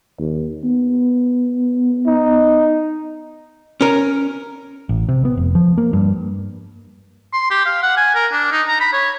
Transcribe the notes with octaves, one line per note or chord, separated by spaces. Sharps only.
D#2
B3
D#4
C#4 A#4
A1
C3
B3
F1
F3
A#3
G2
C6
G4
F5
F#5
G#5
A#4
D4
D#4
A#5
B5
C#5